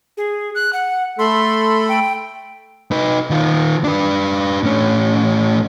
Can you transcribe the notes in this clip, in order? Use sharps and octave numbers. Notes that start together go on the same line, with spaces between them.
G#4
F#6
F#5
A3 A4 B5 C6
G5
D#4 B4
D#3 F4
D4 B4
A2 C#4